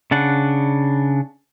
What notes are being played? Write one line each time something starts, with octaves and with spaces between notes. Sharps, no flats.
C#3 D4 F#5